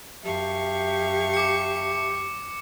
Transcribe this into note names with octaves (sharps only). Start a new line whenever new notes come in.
F#2 G4 E5 F5 A5 C#6
D6 C#7